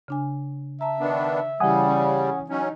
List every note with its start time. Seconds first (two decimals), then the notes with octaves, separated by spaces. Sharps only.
0.08 C#3 D4 G#5
0.81 E5 A5 A#5
1.00 D#3 B3 D4
1.60 C#3 E3 G3 E4 F#5 G#5 D#6
1.88 C#4
2.49 F#3 C#4 D#4